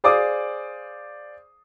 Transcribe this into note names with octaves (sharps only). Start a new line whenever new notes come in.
G#4 C5 D5 F5 D6 D#6